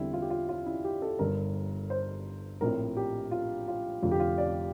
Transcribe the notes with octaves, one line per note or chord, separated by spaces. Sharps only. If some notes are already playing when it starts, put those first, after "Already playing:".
Already playing: E2 D3 G3 C4 E4
F4
G4
F4
F4
E4
G4
A4
G1 G2 D3 A#4
C5
A#1 A2 F3 C4 A#4
G4
F4
F4
F1 F2 D3 F3 F4
G4
F4
D5